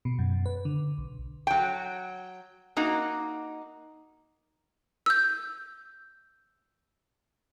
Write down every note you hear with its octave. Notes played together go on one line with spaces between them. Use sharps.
B2
F#2
B4
D3
B1
F#3 G5
A#3 D#4 F#4
E6 G6